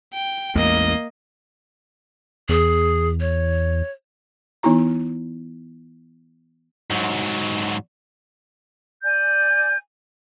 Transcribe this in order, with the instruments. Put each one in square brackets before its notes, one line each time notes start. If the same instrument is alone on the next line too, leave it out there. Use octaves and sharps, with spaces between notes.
[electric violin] G5
[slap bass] A1 E2 G#3 [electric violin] A#3 D#5
[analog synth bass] E2 [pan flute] G#4
[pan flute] C#5
[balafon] E3 B3 D#4 E4 A#5
[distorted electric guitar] G#2 F#3
[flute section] D5 G#5 G6